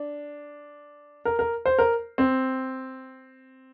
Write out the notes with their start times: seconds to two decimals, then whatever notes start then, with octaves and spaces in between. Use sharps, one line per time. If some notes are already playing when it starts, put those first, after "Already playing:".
Already playing: D4
1.25 A#4
1.39 A#4
1.66 C5
1.79 A#4
2.18 C4